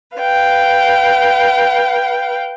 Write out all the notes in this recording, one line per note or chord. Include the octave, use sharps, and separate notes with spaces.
B4 F5 G5